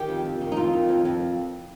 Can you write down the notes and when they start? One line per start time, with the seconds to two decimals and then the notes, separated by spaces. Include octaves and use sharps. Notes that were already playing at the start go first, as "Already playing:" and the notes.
Already playing: D#3 G4
0.09 F2
0.25 F2
0.41 D#3
0.52 D#4
0.56 F2 F4
0.74 D#3
0.89 F2
1.05 F2